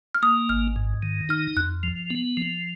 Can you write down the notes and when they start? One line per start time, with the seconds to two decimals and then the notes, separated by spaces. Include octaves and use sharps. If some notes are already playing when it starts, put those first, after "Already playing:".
0.15 F6
0.22 A#3 D#6
0.49 G#1 F6
0.76 G#2
1.03 D#3
1.29 D#4 F6
1.56 F2 F#6
1.83 F3
2.10 B3
2.37 F3